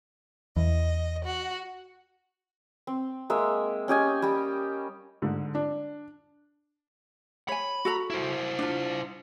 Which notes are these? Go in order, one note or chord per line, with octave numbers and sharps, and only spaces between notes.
E2 D#5
F#4
C4
G#3 A#3 E5
C#4 G4 D#5 G#5
G3 G4
G#2 D3
D4
C#5 G#5 B5
F#4 A4 A#5
E4 C5
D4 F4